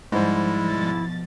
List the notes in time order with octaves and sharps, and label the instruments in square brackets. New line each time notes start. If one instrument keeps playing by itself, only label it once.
[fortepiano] G#2 C5 [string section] F3 [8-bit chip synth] G3 G#3 [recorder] E4
[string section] B2 F3 A6